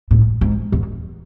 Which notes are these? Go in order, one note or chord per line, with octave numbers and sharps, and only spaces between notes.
A2
G#2
E2